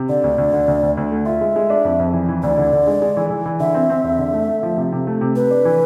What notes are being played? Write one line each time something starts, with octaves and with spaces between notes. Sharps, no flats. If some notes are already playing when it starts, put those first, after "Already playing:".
Already playing: C3
D3 D5
D2
D2
D3
D2
D2
D2
A3
F4 E5
G#3
G#3
D4
F2
F2
E3
E3
D2 D5
D3
D3
G#3
G#3
E3
E3
E3
D3 E5
C4
C4
E2
D3
A3
A3
F3
C3
C3
A3
C3
C3 B4
D4
E3